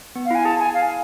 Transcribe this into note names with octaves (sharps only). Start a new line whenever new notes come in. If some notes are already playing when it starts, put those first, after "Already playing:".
B3
F5
E4 G#5
G#4 A5
G#5
F5